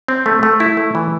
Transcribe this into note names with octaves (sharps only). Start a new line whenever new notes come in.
C4
A3
A3
E4
A3
E3